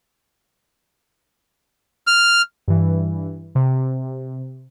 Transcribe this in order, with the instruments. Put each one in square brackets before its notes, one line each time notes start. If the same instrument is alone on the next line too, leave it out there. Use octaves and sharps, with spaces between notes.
[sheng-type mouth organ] F6
[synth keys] G2 E3
C3